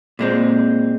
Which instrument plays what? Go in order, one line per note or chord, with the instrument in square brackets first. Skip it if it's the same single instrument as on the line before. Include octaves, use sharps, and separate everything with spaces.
[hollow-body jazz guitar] A#2 G#3 C4